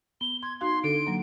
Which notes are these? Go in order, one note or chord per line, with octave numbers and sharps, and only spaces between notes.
B3 G7
C6 G#6
D#4 F#4 F5 C6
D3 D4 A4 D7
F#3 A#3